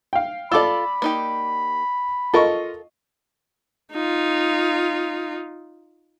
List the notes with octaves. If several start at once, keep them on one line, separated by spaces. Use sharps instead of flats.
F5 G5
F4 A4 D5 B5 D6 E6
A#3 D#4 G4
F4 A4 A#4 D#5 C#6
D#4 F4